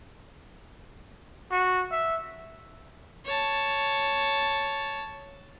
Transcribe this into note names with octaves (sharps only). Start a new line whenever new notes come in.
F#4
E5
C#5 A5